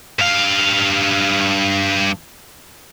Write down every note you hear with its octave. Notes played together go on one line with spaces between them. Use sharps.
G2 F5